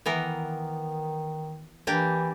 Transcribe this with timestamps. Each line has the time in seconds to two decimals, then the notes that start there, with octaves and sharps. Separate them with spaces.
0.06 D#3 E3 B3 A#4
1.87 E3 A#3 D4 G4